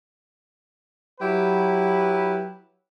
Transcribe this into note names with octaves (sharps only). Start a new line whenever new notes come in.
F#3 E4 G4 B4